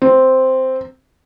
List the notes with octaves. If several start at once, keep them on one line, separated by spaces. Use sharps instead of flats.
C4